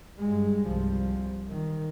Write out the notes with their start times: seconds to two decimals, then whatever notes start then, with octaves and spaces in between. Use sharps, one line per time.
0.19 G2 G#3
0.67 C2 F3
1.49 D#3